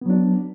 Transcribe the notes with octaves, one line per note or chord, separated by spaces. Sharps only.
F#3 B3 D4